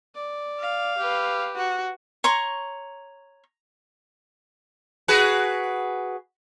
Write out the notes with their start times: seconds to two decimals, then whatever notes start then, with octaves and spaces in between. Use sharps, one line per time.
0.15 D5
0.60 F5
0.98 G4 B4
1.56 F#4
2.24 C#5 A#5 C6 C#6
5.08 F#4 G#4 B4